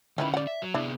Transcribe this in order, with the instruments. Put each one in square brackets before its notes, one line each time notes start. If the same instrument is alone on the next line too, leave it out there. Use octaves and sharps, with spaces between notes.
[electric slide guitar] D3 C#4 [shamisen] D#3 E4 B4
[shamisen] D5 F#5
[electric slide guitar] E5
F#3
[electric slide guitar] C3 B3 G#4 [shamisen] D4 E4